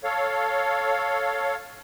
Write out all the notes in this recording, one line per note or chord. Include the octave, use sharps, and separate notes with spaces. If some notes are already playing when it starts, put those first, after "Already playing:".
A4 C#5 F5